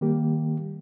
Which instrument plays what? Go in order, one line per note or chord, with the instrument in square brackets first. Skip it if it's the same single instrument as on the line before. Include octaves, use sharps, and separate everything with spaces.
[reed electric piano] D#3 G3 A#3 G4